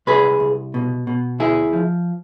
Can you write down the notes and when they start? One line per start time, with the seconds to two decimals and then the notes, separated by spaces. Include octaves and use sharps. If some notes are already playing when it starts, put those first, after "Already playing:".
0.07 C2 G#4 B4
0.40 C2
0.74 B2
1.07 B2
1.39 D2 E4 G#4
1.73 F3